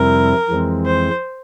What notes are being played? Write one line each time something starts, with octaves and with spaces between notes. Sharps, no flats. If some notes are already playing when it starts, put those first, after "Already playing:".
Already playing: F2 C3 G3 C4 E4 A#4
F2 E3 G#3 C4
C5